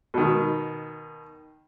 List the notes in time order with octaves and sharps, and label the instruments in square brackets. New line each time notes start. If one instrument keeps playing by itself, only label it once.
[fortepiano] B2 D#3